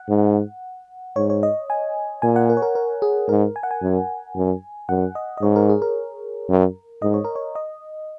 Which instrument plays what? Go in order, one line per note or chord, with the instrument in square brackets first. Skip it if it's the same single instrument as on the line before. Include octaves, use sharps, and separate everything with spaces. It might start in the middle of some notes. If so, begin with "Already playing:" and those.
Already playing: [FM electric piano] F#5
[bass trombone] G#2
[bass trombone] G#2 [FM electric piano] C#5
[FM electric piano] C#5
D#5
G#5
[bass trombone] A#2 [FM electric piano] G#5
[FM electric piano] F#5
A#4
C#5
A#4
A#4
G#4
[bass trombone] G#2 [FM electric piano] A#4
[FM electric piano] G#5
F#5
G#5
[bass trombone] F#2
F#2
[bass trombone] F#2 [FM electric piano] F#5
[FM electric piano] D#5
D#5
[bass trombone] G#2 [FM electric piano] C#5
[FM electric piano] A#4
G#4
A#4
[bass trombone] F#2
[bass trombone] G#2 [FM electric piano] D#5
[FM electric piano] C#5
A#4
C#5
D#5